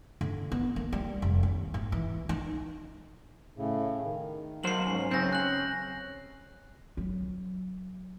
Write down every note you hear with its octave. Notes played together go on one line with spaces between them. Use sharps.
D3
B3
A#3
G3
F1
D#2
G#2
E3
D#4
A2 C#3
D#3
B1 F#3 A#3 D#4 C5 C7 F#7
G#2 C#4
F#2 C#3 C4 C#4 G6 A#6
F#6 F#7
F#3